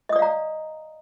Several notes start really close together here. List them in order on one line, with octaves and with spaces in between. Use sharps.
D#5 D#6 D5 F5 A#5